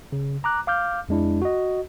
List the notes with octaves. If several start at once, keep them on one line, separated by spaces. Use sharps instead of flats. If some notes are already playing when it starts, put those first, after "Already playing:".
C#3
A#5 D6 F#6
F5 D6 F6 G6
F2 G#3 D4 E4
F#4 D#5